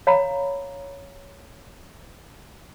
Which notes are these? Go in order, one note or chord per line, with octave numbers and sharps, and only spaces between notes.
C#5 F5 A#5 B5